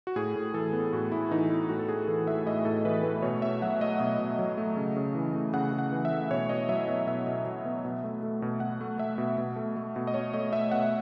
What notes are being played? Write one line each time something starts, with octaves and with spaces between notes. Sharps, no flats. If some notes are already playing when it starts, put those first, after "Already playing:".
F#4
A2 G#4
A2
E3 A4
B3
A2 F#4
A2 E4
E3 D#4
B3 E4
A2 F#4
A4
A2 G#4
E3 A4
A3 E5
A2 D#5
A2 A4
E3 B4
A3 B4
B2 C#5
B2 E5
F#3 F#5
A3 D#5
B2 D#5
B2
F#3
A3
C#3
C#3
E3
A3
C#3 F#5
C#3
F#5
E3
E5
A3
B2 C#5
B2 D#5
F#3 E5
B3 E5
B2 E5
B2
F#3
B3
B2
A3
A3
B2
B2 F#5
A3
A3 E5
B2
B2
A3
A3
B2
D#5
B2 C#5
A3 D#5
A3 E5
B2 F#5